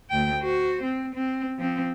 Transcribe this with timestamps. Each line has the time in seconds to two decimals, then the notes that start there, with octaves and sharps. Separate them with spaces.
0.10 D2 G5
0.42 F#4 C5
0.83 C4
1.14 C4
1.58 F3 C4